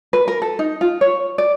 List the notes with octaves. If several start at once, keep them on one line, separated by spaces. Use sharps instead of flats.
B4
A#4
A4
D#4
F4
C#5
D5